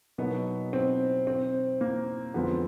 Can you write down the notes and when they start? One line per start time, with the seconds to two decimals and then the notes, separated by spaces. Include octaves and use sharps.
0.18 B2 F#3 A#3 B3 D#4
0.73 C4
1.27 C4
1.81 A#3
2.34 F2 D3 F3 G#3 B3 C4